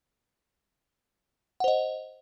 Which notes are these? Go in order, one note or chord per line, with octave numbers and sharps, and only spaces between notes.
C5 D#5 F#5